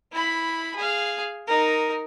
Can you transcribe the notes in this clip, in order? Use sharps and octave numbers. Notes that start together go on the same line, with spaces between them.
E4 B5
G#4 F5
D#4 A#4